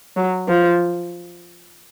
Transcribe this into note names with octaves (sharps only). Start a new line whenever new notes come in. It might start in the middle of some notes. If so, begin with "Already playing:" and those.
F#3
F3